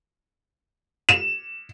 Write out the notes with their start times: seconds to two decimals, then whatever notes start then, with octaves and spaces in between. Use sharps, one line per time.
1.09 E7